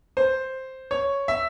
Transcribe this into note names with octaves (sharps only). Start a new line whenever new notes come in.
C5
C#5
E5